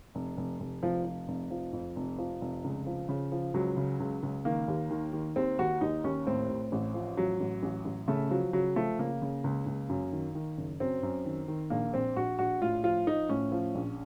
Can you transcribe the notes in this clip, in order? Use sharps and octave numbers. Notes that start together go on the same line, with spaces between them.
F1
F1
F1
F1 F3
F3
F1
F3
F2
F1
F3
F1
C#2
F3
C#3
F3
C#2 F#3
C#3
C#2
C#2
D#3 A#3
D#2
D#3
D#3
D#2 C4
D#2 F#4
D#2 D#4
D#2 C#4
A2 C4
A2
A1
F3
A1 F#3
A1
A1
A1
C#3 A3
F3 F#3
C#3 F#3
F3 A3
C#3 A#3
C#3
C#2
C#2
F#2
D#3
D#3
F#1
F#2 C4
F#2
D#3
D#3
A#1 A#3
A#1 C4
A#1 F#4
A#1 F#4
A2 F4
F3 F4
F3 D#4
A2 C#4
F3
A#1